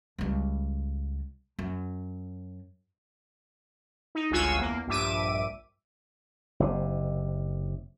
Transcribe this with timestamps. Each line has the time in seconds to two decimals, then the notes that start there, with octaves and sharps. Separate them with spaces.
0.18 C#2 G3
1.59 F#2
4.15 D#4
4.31 G1 C#2 F4 F#4 G#5 E6
4.57 E2 A#3
4.87 A#1 G2 E5 D6 D#7
6.60 F#1 C3